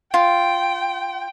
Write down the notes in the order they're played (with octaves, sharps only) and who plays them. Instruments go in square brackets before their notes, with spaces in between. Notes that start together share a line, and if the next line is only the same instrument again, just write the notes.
[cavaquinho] F4 [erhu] G5